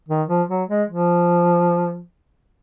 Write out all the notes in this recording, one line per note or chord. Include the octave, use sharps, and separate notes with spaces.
D#3
F3
F#3
G#3
F3